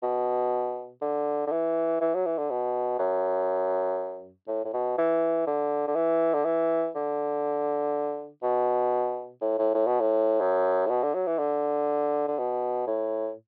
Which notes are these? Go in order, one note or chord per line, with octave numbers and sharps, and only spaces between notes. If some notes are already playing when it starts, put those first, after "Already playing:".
B2
D3
D3
E3
E3
F#3
E3
D3
B2
F#2
A2
A2
B2
E3
D3
D3
E3
D3
E3
D3
B2
A2
A2
A2
B2
A2
F#2
A2
B2
D3
F#3
E3
D3
D3
B2
A2